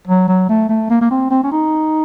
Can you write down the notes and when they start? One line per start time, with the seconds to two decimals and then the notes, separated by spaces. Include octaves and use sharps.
0.07 F#3
0.28 F#3
0.49 A3
0.69 A3
0.90 A#3
1.01 A#3
1.11 C4
1.31 C4
1.44 C#4
1.52 D#4